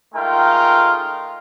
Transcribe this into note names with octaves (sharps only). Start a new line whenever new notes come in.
G#3 A3 D#4 F4 A#4 G5